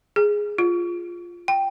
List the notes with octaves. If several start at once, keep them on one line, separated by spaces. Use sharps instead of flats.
G#4
F4
G5